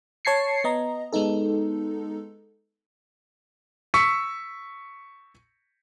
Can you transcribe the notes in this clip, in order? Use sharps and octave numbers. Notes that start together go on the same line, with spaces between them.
C#5 A5 G#6 C7 C#7
B3 D#5 A#5
G#3 B3 D#4 A4
C#6 E6 B6 C#7